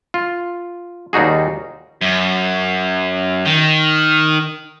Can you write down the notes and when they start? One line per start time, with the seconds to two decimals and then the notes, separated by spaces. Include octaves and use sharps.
0.14 F4
1.13 D#2 G3 D#4 F#4 G#4
2.01 F#2
3.45 D#3